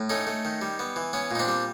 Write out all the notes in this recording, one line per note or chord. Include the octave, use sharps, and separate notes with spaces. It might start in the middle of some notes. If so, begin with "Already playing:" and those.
Already playing: A2
A3 C#4 D#4
A3
D#3
G3
B3
E3
B3 C#4
A#2 D#4
C4 D4
G3